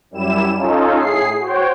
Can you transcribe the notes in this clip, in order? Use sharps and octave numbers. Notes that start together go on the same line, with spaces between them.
F#2 G3 E4 E7
C#4 D#4 F4 A4
A2 G#4 C7
F#4 C5 C#5 G5